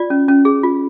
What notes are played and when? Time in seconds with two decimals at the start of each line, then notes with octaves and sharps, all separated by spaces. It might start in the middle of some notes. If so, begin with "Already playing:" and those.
Already playing: F4 D5
0.10 C#4
0.28 C#4
0.45 G#4
0.63 F4